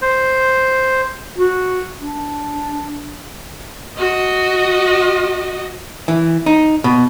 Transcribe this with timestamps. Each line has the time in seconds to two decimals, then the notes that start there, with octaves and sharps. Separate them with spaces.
0.02 C5
1.36 F#4
1.99 D4
3.98 F#4 D#5
6.08 E3
6.46 D#4
6.84 B2